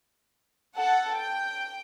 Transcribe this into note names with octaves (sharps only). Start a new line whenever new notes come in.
A4 F#5
G5